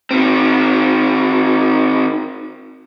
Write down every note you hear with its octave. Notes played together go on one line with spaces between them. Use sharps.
D#3 C4